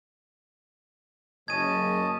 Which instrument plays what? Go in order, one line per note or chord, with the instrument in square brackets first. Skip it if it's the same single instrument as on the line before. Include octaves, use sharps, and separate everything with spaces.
[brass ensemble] F#1 [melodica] C#4 D#5 A5 [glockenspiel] G#6 D#7